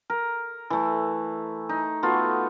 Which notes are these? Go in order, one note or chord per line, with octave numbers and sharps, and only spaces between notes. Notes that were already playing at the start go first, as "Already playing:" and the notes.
A#4
E3 A3
D#4
A3 B3 F4 F#4